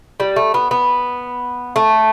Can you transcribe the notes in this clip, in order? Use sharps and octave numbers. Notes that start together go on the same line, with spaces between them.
G3
A3
B3
B3
A3